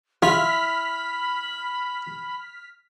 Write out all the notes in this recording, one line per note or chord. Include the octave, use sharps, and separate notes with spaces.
E4 F4 B5 F6 B6